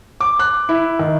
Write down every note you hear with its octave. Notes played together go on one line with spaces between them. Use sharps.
D6
F#6
E4
D#3